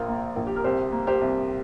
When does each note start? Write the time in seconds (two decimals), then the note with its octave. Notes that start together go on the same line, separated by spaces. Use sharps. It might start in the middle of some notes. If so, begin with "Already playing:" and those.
Already playing: A#1 F4 A#4
0.08 A#3
0.36 A#1
0.47 G4
0.56 A#4
0.64 C2 G4 C5
0.92 A#3
1.07 G4 C5
1.21 C2